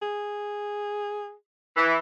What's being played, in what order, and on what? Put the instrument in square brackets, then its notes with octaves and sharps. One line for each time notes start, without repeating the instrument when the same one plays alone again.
[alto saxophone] G#4
[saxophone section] E3